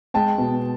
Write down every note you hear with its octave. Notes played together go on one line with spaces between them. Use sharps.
G#3 G5 A5
B2